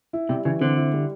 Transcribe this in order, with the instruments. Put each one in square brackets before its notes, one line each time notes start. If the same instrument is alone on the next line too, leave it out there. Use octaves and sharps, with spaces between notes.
[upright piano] E4
[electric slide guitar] C3 [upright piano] G3
[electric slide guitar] C#3 [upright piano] E3
[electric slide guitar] D3 [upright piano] C4
[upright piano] E4
G3